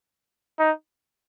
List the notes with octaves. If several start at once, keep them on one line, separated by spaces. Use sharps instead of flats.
D#4